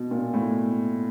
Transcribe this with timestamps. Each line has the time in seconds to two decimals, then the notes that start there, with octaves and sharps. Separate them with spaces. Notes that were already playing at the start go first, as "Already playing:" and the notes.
Already playing: B2
0.11 A#2
0.33 A2